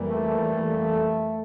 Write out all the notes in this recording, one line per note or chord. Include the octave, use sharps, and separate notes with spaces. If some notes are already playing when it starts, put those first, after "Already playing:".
Already playing: F2 E3 G3 A#3
A3